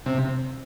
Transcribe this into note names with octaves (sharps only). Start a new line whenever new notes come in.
C3